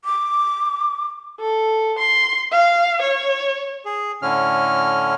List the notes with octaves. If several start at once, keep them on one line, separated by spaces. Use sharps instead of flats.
D6
A4
C6
F5
C#5
G#4
A2 D3 C#4 F6